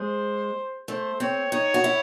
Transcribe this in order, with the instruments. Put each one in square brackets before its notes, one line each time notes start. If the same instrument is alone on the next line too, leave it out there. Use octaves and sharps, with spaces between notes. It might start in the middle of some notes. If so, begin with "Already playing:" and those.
Already playing: [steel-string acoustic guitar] G#3 [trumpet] C5
[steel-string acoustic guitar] A3 [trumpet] C5
[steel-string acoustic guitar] C4 [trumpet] C#5
[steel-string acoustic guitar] D#4 [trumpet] C#5
[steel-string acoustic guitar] F#4
E4